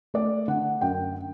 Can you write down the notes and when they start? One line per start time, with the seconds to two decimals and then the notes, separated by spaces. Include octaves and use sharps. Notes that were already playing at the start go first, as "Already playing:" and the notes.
0.14 A3 D5
0.48 D3 F#5
0.81 F#2 G5